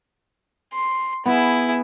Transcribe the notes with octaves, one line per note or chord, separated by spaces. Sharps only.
C6
B3 E4 G#4